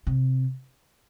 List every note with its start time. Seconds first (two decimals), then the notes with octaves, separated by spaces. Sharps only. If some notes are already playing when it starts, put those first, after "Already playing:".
0.07 C3